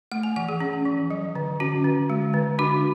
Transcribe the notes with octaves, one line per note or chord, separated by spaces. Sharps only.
A3 F#5
G#5
E3 F#5
G#4
C#4
E3
F#3
D3
C#4 F#4
D3
G#3
D3
D4 F#4